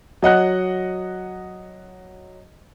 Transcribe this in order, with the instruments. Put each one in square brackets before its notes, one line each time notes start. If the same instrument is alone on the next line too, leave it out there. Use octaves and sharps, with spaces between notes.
[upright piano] F#3 D#5 F#5 F#6